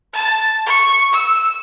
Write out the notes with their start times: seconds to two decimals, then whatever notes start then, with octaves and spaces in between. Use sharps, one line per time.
0.13 A5
0.66 C#6
1.13 E6